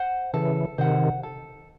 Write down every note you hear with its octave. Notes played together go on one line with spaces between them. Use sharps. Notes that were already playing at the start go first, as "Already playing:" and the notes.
Already playing: C5 F#5
C#3 E3 A4
C3 D#3 C5 F#5
A4